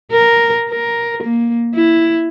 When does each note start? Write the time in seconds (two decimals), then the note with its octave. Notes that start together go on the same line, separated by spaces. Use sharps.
0.12 A#4
0.69 A#4
1.23 A#3
1.75 E4